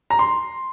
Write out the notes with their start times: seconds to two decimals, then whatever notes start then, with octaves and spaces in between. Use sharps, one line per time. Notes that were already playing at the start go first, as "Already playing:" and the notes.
0.10 A#5
0.19 C6